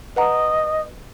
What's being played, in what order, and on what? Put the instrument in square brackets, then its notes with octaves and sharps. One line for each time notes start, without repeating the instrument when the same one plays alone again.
[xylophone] B4 F#5 A#5 [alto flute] D#5